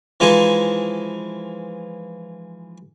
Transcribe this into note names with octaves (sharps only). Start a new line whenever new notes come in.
E3 F3 G#3 D#4 G#5